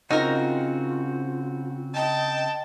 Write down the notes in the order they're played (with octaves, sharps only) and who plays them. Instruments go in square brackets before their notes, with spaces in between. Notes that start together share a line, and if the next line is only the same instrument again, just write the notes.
[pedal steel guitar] C#3 C4 F#4 [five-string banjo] D#4 A#4 [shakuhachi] F4
[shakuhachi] D#5 [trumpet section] G5 A5